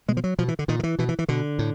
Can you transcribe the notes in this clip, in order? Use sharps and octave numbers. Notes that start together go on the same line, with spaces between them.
B2 G#3
F3
F#3
B2 F3
E3
D3
A#2 D#3
D#3
E3
B2 E3
E3
E3
B2 D3
A2